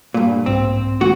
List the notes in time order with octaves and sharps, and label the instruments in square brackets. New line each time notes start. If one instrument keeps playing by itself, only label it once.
[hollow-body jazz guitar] G2 A#2
[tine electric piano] B1 G#2 [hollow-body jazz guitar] C4
[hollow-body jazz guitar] D#2 G#2 F#4